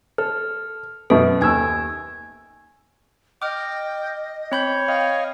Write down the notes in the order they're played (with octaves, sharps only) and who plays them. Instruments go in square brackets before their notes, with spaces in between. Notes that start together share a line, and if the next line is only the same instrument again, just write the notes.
[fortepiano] A4 [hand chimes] F6
[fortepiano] F#2 B2 [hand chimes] D#4 A4
[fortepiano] D#2 E6 [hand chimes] G#5 G#6
[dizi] D#5 [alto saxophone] G5 [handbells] D6 F6
[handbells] C4 B5 G6 [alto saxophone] C#5
[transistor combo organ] D#5 F5 [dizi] G5